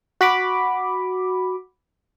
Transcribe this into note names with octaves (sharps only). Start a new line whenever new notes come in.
F#4 B5 D6